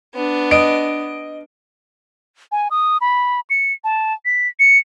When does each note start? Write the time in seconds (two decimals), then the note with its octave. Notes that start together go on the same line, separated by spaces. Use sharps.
0.14 B3 D4
0.51 D#5 D7
2.52 G#5
2.71 D#6
3.01 B5
3.50 C#7
3.84 A5
4.25 B6
4.60 C#7